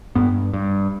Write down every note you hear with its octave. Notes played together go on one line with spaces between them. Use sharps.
G2 B3
G2